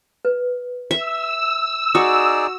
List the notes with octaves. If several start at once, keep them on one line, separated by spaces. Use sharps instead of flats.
B4
E5 E6
D#4 F#4 G#4 D5 D#6